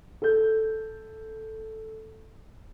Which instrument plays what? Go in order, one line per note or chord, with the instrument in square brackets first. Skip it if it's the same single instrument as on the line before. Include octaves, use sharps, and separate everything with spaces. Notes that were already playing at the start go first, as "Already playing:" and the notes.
[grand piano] A4 G6